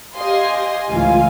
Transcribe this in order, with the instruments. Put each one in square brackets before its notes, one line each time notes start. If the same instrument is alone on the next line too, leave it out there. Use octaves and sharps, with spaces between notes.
[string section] G4 D#5 F5 G#5 C6
C#2 A2 E3 F4 F5 G#5